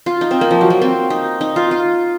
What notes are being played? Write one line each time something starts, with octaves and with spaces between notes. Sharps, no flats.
F4
D#4
C4
A#3
F3
F#3
A#3
C4
D#4
D#4
F4
F4